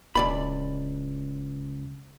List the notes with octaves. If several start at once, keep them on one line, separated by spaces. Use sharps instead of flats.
D1 C#2 D5 B5